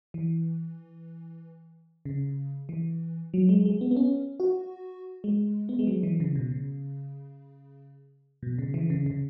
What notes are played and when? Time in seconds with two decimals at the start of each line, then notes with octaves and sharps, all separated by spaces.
0.14 E3
2.05 C#3
2.69 E3
3.34 F#3
3.49 G#3
3.65 G#3
3.81 B3
3.91 B3
3.97 C#4
4.40 F#4
5.24 G#3
5.69 B3
5.79 G#3
5.87 F#3
6.03 E3
6.20 C#3
6.36 B2
6.51 C#3
8.43 B2
8.59 C#3
8.74 E3
8.90 C#3
9.06 C#3